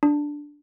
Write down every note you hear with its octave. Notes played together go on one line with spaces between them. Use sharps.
D4